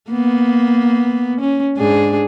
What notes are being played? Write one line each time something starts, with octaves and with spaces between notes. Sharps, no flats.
A#3 B3
C#4
G#2 D4 G#4